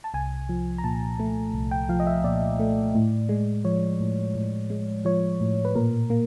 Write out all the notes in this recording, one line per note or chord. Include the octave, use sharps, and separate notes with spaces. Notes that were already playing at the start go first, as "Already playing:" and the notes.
A5
C2 G#5
F3
A#5
A#2 A5
A3
C2
G5
F3 F5
D#5
E5
A#2 D5
A3
A2
G#3
F3 C#5
A2
A2
G#3
F3 C#5
A2
B4
A#2 A#4
A#3